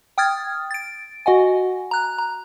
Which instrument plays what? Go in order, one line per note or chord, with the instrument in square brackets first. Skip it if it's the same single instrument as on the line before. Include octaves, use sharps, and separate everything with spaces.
[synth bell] G5 D#6 F6 G#6 A6
A6 D7
F#4 D#5 F#5 G#5
A#5 F#6
A#5